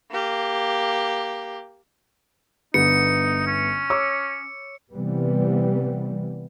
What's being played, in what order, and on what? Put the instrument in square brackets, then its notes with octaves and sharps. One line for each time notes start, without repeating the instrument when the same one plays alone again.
[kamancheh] A#3 G4
[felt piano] G1 D3 B3 [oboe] D#4 [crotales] C#7
[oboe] C#4
[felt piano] C#5 D6 E6
[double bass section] C3 E3 G3 B3